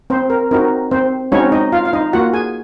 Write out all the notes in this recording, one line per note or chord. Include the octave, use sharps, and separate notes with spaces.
C4 C5
A#4
C4 D#4 F#4 A#4
C4 C5
G#3 C4 C#4 D#4 F#4 C#5
D#4 D#5
F4 F5
F5
D#4 D#5
A#3 F4 F#4 F#5
G#4 G#5